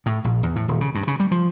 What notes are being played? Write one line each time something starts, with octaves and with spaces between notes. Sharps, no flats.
A2
A#1
E2
A2
D#1
C#3
G2
C#3
G3
F3